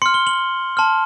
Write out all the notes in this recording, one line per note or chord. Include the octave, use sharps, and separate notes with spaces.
C6 F6 C#7
G7
F#7
A5 C6 F6